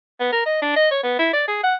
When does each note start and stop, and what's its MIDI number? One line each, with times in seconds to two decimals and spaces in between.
0.20 0.30 59
0.32 0.43 70
0.46 0.61 75
0.62 0.73 62
0.76 0.90 75
0.91 1.02 73
1.03 1.16 59
1.19 1.31 64
1.33 1.44 74
1.48 1.60 68
1.64 1.75 78